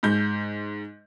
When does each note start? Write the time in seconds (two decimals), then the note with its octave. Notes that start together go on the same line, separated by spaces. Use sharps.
0.03 G#2 G6